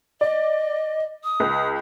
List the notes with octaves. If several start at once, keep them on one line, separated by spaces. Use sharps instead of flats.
D5 D#5
D#6
C#2